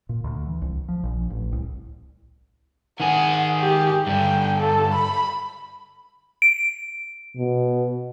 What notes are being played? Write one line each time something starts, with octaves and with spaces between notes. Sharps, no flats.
A#2
D2
E3
C2
F3
A#1
A1
C2
D#3 G#4 F#5
G4
G2 D3 G5
A4
B5
D7
B2